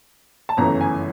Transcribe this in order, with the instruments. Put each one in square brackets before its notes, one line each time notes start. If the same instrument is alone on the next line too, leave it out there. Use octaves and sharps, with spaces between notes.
[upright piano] A5
G1 F#2 C#3 E3 A3 A#5
G#5